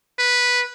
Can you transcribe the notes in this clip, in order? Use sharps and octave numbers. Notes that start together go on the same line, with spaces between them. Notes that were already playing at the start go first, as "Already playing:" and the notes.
B4